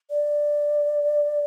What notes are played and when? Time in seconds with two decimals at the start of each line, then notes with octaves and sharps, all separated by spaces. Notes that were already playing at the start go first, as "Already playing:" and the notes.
0.10 D5